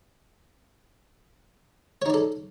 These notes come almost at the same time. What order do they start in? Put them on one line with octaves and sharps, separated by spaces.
C#5 D#4 D5 A4